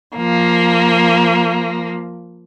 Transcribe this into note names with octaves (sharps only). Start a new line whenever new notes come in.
F3 A#3